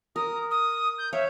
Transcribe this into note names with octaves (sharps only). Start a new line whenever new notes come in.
A#4 D#6
D#6
G6
C#5 E5 F5